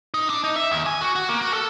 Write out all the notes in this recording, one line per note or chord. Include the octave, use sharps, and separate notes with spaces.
D#4
D4
D#4
E5
D#2
G#5
F#4
F#4
A#3
F#4
A4